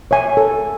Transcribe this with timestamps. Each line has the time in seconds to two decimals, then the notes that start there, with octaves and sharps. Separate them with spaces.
0.11 C#5 E5 G#5 C#6
0.37 A4